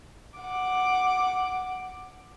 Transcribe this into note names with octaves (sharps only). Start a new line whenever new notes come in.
F#5 D6